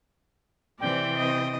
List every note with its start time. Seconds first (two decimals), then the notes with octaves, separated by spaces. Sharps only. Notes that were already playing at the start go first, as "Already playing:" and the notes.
0.80 C3 E3 C4 D5 G5
1.17 D#5